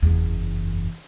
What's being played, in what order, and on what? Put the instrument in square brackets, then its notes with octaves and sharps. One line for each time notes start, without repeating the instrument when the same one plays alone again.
[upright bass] F#1 E2